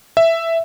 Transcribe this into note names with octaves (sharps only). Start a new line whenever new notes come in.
E5